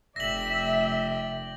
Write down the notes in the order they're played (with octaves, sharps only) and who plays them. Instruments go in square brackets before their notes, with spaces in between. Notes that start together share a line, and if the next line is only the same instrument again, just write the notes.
[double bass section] F1 [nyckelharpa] D5 G5 [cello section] E5 [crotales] A#6 F#7